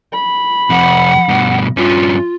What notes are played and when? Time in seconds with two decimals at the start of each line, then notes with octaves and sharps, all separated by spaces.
0.13 B5
0.70 F2 C3 F#5
1.28 G2 B2
1.77 G2 C#4 F4